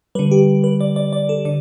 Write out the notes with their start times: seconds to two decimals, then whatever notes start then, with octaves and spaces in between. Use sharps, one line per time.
0.15 D3 G3 B4
0.31 G4
0.64 B4
0.81 D5
0.96 D5
1.13 D5
1.29 A4
1.45 D3 D5